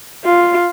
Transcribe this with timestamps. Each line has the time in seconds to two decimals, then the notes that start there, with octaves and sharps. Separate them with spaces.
0.25 F4